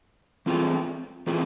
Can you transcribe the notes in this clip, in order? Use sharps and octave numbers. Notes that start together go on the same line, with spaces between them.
E3 A3 C4 F4 G#4
E3 A3 C4 F4 G#4